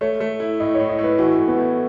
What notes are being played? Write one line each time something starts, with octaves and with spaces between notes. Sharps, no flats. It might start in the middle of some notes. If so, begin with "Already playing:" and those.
A3 C#5
A3
E4
A2 D#5
A2 C#5
D#5
A2
B4
E3 F#4
A2
B3
A3